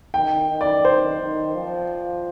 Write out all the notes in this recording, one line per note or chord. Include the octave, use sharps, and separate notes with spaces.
D#3 G5
D#3
D5
D#3 C5
D#3
F3